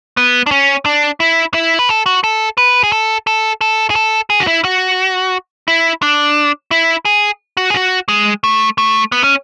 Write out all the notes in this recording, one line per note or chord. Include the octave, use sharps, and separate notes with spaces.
B3
D4
C#4
D4
E4
E4
B4
A4
F#4
A4
B4
G#4
A4
A4
A4
G#4
A4
G#4
F#4
E4
F#4
E4
D4
E4
G#4
F#4
G#4
F#4
G#3
A3
A3
B3
C#4